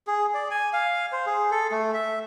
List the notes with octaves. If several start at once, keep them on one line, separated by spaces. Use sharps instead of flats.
G#4
D5
G#5
F5
C5
G#4
A4
A3
E5